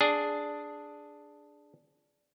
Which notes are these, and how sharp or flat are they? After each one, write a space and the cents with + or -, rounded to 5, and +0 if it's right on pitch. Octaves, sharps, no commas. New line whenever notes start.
D4 +0 G#4 +0